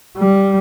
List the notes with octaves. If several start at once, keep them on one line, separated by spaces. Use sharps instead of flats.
G3